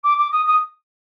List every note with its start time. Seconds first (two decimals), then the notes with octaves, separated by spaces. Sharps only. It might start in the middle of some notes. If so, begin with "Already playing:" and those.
0.03 D6
0.17 D6
0.31 D#6
0.46 D#6